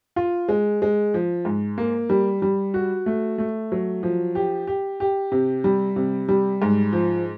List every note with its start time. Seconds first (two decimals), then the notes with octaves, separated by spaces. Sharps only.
0.16 F4
0.48 G#3
0.82 G#3
1.14 F3
1.45 G#2
1.78 A#3
2.09 G3
2.42 G3
2.74 F#4
3.06 A3
3.38 A3
3.72 F#3
4.03 F3
4.35 G4
4.67 G4
5.00 G4
5.32 C3
5.64 G3
5.96 C3
6.28 G3
6.62 G#2
6.93 F3